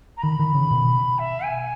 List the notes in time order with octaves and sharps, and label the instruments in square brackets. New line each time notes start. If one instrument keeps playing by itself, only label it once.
[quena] A#5
[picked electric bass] D#3 [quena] B5
[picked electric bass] D#3
C#3
B2
[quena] E5
G#5